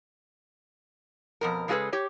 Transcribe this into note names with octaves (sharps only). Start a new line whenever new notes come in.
F2 B2 A#4
C#3 G#3 F4 G#4 A4 B4
G4 C#5